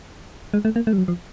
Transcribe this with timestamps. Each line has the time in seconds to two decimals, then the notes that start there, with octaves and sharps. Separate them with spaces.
0.54 G#3
0.65 A3
0.76 A#3
0.87 A3
0.93 G3
0.98 F#3
1.08 F3